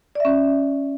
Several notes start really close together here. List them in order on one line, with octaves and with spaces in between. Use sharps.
D5 E5 C#4